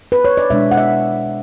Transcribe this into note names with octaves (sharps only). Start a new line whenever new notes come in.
B4
C#5
D5
B2 G#3 D4 E5
F#5
E5